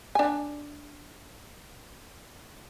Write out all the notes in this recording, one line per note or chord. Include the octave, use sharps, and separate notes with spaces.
D4 G#5